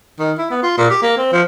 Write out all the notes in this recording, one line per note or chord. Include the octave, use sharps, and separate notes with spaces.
D#3
E4
B3
F4
A#2
G4
A#3
C4
F3